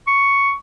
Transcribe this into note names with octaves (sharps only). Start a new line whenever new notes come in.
C#6